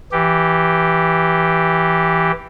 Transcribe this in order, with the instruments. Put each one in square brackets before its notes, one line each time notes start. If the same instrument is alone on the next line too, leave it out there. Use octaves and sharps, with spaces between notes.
[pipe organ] E3 G4